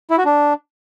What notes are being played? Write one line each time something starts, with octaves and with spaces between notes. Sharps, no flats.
E4
F#4
D4